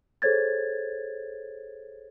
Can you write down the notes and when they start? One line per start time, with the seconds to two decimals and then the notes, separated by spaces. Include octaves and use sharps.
0.22 G#4 A4 C5 C#5 G#6 A6